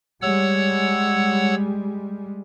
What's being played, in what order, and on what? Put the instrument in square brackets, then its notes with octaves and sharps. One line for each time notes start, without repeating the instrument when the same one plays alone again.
[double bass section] G3 G#3 [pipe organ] C#5 F#5 E6